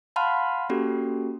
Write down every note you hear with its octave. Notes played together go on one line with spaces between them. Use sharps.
F5 F#5 A5 B5 C6 F6
A#3 C#4 F#4 G4 A4